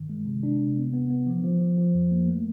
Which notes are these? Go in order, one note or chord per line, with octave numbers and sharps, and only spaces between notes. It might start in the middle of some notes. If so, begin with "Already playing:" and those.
Already playing: G2 D#3
G#3
C3
D4
C3
B3
B3
B3
F3
F3
F3
F3
F2
A#3
A3